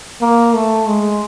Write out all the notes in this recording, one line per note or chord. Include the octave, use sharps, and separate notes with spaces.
A#3
A3
G#3